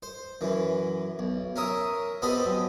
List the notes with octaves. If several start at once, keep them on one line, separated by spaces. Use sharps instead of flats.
C5
F#2 E3
B1
C#4 A#4 E5 D#6
B3 C4 G4 A4 D#5 B5
F#2